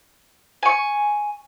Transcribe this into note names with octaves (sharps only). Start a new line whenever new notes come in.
G#5 C#6